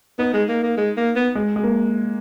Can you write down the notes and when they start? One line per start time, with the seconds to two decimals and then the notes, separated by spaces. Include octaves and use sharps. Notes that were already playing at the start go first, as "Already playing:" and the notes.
0.19 B3 D#4
0.33 G#3
0.48 A#3
0.63 A#3
0.77 G#3
0.97 A#3
1.16 B3
1.35 G#3
1.56 G#3
1.63 A#3